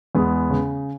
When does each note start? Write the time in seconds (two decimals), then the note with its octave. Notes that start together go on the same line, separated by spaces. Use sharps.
0.15 E2 G#3 B3
0.50 C#3